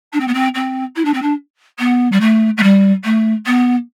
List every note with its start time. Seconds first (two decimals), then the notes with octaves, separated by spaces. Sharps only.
0.12 D4
0.20 C4
0.27 B3
0.34 C4
0.54 C4
0.96 E4
1.04 D4
1.13 C4
1.22 D4
1.79 B3
2.12 G3
2.20 A3
2.57 A3
2.63 G3
3.04 A3
3.46 B3